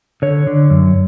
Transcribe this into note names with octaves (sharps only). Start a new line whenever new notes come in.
D3 C#5
D3
F#2